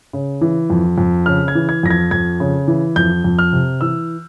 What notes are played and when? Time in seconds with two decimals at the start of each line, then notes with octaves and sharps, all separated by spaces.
0.13 C#3
0.41 E3
0.70 F2
0.98 F2
1.26 C#3 F6
1.48 G#6
1.55 E3
1.69 G#6
1.83 F2 A#6
1.90 G#6
2.11 F2 G#6
2.40 C#3
2.68 E3
2.96 F2 G6
3.24 F2
3.39 F6
3.53 C3
3.81 E3 E6